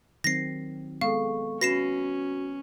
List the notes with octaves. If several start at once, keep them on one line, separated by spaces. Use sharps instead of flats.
D#3 F#3 C4 A#6 C7
G#3 B3 A4 F5 C#6
C#4 F#4 B4 A#6 C7 E7